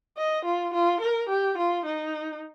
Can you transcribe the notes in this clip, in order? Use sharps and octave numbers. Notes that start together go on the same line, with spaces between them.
D#5
F4
F4
A#4
G4
F4
D#4